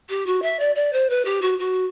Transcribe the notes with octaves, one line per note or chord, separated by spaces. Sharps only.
G4
F#4
E5
D5
D5
C5
B4
G4
F#4
F#4